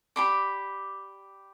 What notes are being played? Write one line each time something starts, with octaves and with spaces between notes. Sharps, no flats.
G4 D5 B5 D6